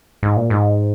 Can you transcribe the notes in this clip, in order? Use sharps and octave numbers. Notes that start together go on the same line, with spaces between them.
G#2
A#2
G#2